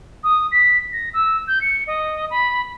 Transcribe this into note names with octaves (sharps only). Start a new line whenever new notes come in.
D#6
B6
A#6
E6
G6
C#7
D#5
B5